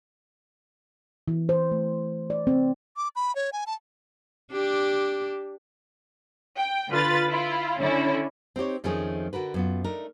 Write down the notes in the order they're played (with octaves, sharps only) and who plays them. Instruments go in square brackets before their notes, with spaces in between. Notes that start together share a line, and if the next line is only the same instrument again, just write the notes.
[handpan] E3
C5
A3
D5
C4
[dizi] D6
B5
C#5
G#5
A5
[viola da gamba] D4 G4
[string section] G5
D3 F4 B4 A6
E4 F4
D3 C#4 E4
[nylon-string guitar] C4 D#4 G4 C#5
F2 D#3 F3 A3 C#4 G#4
D3 F#4 A#4 B4
F#2 B3 F4
A3 D4 D#4 A#4